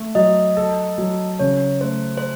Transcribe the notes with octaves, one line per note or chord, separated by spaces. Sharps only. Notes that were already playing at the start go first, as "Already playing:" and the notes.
Already playing: A3
F#3 D#5
A4
F#3
C#3 C#5
A3 C5
C5